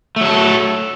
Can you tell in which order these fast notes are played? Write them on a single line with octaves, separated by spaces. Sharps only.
A3 F#3 A4